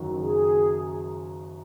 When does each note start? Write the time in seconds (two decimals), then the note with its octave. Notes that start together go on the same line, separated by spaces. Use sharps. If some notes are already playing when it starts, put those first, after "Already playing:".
Already playing: F#1 F#2 D#3 F#3
0.20 G#4